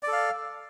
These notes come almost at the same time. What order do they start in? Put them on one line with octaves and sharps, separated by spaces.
D5 A4 F5